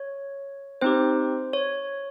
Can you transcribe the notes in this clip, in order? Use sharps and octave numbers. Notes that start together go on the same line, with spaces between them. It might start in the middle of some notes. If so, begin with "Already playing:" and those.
Already playing: C#5
C4 D#4 G4 C5
C#5